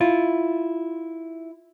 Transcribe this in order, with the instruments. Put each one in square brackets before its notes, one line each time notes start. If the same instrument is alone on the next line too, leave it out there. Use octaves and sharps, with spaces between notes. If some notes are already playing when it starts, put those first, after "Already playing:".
[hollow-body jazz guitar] E4 F4